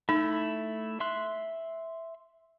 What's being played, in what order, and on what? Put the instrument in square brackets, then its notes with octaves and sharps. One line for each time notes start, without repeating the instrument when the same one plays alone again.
[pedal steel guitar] A3 E4 [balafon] D#4
[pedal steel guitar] E5 C6 F#6